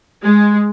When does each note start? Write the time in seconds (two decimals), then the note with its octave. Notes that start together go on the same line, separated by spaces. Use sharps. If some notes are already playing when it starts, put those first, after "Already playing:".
0.23 G#3